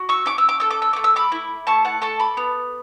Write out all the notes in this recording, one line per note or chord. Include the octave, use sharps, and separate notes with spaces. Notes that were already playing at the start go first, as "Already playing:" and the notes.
Already playing: F#4
C#6 E6
C#4 D6
E6
D6
A4 E6
D6
E6
A3 D6
E6
B5 D6
E4
A3 A5 C#6
F#5 A5
A4 A5 C#6
B5 D6
B3